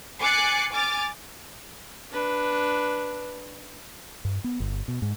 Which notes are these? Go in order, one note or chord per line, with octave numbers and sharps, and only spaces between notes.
G#5 D6 F#6 A6 C7 C#7
G#5 D6 F6 A6
D4 B4
G2
B3
G1
B2
G#2